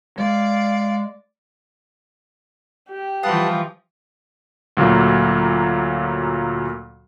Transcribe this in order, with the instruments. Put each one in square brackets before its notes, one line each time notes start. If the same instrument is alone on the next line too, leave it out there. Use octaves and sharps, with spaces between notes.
[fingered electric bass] G#3 [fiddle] D5 [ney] F5
[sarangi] G4
[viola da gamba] E3 F3 G3 [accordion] B4 F#5 A5 [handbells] F5 D#6
[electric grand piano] D2 A#2 F#3 A#3